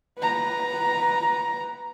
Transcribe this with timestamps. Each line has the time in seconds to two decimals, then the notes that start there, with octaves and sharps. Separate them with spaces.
0.18 B4 A#5